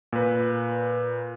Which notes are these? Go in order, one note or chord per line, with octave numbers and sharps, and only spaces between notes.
A#2 B4